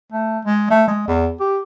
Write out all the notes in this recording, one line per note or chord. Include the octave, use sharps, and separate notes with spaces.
A3
G#3
A3
G#3
E2
G4